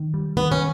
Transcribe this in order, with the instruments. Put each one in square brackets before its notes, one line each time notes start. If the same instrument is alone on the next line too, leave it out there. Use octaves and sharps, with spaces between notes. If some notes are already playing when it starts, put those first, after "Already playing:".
Already playing: [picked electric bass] D#3
G3
[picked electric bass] D#3 [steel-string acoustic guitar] B3
[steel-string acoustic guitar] C#4